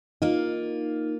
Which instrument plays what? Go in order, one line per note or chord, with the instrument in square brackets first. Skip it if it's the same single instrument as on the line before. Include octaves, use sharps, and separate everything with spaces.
[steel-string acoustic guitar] A#3 F4 [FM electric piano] D#4